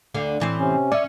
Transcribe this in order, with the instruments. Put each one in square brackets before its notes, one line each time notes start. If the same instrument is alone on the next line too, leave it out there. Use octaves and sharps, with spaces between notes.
[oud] D2 D3 F5
A2 E3 C4
[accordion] C3 C#4
[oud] C#4 [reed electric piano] D5 E5